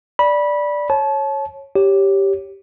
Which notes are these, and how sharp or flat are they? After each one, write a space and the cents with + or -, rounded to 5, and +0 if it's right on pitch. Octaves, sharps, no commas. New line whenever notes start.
D5 +0 B5 -20
C#5 -15 A5 -30
G4 +0 C#5 +0